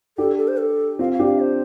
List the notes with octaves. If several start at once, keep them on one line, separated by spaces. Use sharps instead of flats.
D4 G4 A4
A4
C5
A4
C4 F4 F5
F5
D4 G4
F5
C5